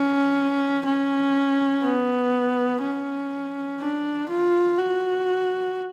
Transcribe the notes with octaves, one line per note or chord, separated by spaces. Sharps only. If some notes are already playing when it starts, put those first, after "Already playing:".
Already playing: C#4
C#4
B3
C#4
D4
F4
F#4